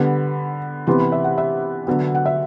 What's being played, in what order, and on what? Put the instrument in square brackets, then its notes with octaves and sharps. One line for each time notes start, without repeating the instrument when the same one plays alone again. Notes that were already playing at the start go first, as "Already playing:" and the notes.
Already playing: [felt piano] D3 G3 B3 B5
C3 E3 B3 C6
B5
E5
F#5
E5
D3 F#3 B3
F#5
E5